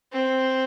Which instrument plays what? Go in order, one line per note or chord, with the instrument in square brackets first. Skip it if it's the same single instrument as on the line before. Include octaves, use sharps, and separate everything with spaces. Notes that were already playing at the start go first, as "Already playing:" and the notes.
[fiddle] C4